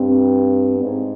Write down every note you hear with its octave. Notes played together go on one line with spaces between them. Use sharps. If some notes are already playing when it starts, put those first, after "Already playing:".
Already playing: G2 C4
B3
G#2 C4